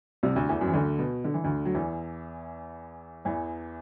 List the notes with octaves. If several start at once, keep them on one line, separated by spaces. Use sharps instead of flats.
C2 C3
D2 D3
E2 E3
F#2 F#3
E3
D2 D3
B2
D3
E3
D2 D3
F#3
E2 E3
E2 E3